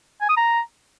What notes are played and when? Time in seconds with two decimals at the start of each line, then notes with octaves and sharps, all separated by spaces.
0.21 G#5
0.29 D#6
0.37 A#5